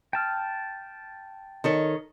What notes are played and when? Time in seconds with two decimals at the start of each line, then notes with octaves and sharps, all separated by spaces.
0.13 G5 A5 F6
1.64 D#3 A4 C#5